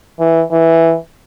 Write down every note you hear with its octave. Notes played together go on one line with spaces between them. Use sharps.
E3
E3